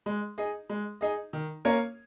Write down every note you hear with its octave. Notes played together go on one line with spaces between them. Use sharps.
G#3
D#4 G#4 D#5
G#3
D#4 G#4 D#5
D#3
A#3 C#4 A#4 C#5